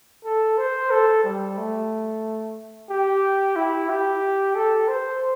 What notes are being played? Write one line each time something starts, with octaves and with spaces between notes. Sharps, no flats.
A4
C5
A4
G3
A3
G4
E4
G4
A4
C5